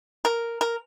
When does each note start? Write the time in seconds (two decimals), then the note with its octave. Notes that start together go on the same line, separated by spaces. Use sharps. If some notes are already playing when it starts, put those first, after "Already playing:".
0.25 A#4
0.61 A#4